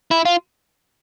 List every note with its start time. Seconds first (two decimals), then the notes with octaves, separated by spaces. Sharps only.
0.11 E4
0.25 F4